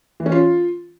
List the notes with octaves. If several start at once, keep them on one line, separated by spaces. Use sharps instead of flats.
E3
C#4
F4